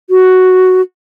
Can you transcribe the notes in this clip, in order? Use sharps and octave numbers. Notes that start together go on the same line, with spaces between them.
F#4